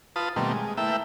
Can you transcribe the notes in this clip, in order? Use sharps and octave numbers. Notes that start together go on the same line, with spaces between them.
F4 B4 A5 D#6
B2 D#3 G3 A3 A#3 C4
G#3
A3 A#3 E4 B4 E5 G5